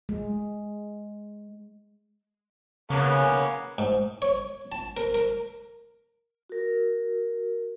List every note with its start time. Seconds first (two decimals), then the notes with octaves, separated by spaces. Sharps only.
0.09 G#3
2.90 C#3 A#3 B3 C#4
3.78 G#2
4.22 C#5
4.72 A5
4.97 A#4
5.14 A#4
6.49 F#4 A#4